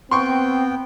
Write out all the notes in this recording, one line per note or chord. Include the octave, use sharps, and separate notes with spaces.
B3 C4 G5 C6 C#6